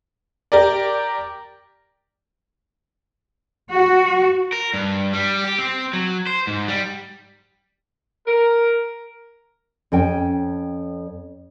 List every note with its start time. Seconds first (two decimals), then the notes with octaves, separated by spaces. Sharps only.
0.52 G4 A#4 D5
3.74 F#4
4.52 A#4
4.74 G2
5.13 G3
5.44 G4
5.58 C4
5.93 F#3
6.27 C5
6.47 G#2
6.68 G3
8.27 A#4
9.92 F2 C#4 G5